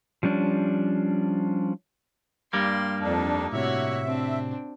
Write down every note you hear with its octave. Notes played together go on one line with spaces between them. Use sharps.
F3 G3 C#4 D4
G2 G3 A#3 C6
F2 D4 D#4
A2 C3 F#4 C#5 E5
C4 D4